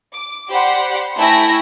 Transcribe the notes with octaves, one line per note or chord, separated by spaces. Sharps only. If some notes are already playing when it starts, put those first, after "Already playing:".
D6
G4 C5 D5 F#5 B5 C6
A3 E4 G5 G#5 B5 A#6